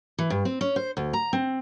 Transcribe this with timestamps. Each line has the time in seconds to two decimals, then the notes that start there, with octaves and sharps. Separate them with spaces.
0.18 E3
0.30 G2
0.45 C4
0.61 C#4
0.76 C5
0.97 D2
1.13 A#5
1.33 C4